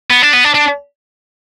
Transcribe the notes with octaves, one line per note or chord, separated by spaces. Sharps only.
B3
D4
B3
D4
D4